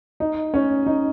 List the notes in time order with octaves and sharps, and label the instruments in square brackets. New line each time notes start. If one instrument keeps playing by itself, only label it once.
[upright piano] D#4
C#4
D#4